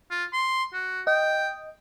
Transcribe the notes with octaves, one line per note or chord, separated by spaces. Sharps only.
F4
C6
F#4
D#5 G5